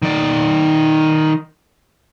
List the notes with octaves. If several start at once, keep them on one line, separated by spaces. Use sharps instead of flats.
D#3 D5